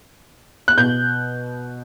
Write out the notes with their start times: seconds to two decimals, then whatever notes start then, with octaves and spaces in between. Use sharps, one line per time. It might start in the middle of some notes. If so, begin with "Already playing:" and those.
0.68 F#6
0.78 B2 G6